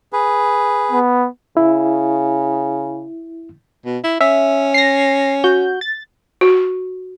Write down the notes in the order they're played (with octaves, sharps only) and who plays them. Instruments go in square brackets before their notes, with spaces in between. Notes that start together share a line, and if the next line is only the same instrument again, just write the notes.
[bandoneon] G#4 B4
[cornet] B3
[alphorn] C#3 [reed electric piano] E4
[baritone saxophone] B2
E4
[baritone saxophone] C#4 [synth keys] E5
[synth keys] A#6 C7
F#4 G6
A6
[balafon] F#4